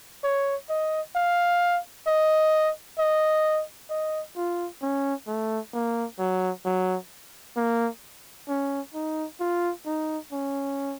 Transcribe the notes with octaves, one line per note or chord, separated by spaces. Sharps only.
C#5
D#5
F5
D#5
D#5
D#5
F4
C#4
A3
A#3
F#3
F#3
A#3
C#4
D#4
F4
D#4
C#4